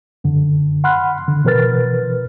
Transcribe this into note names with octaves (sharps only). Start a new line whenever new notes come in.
F#2 D3
F#5 B5 C6 F6 F#6
D3
B2 E3 A#4 B4 F6 A6